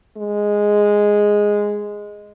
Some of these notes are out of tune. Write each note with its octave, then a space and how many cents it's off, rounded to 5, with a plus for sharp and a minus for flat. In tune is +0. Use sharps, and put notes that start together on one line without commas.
G#3 -5